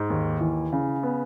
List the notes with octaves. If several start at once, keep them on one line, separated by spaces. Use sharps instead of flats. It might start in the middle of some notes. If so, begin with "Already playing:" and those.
Already playing: G#2
D#2
E3
C#3
B3